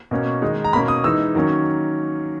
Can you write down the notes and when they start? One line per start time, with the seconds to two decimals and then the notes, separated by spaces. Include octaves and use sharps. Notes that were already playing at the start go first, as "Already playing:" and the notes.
0.11 B2 A#3 C#4
0.42 D#3 G#3 D#4
0.64 A#5
0.73 B2 A#3 C#4 B5
0.88 D#6
1.04 E3 G#3 D#4 E6
1.35 D#3 F#3 A#3 C#4